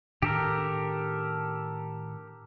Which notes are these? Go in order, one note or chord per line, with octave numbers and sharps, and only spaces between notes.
A2 D#3 D4 G4 A4 A#4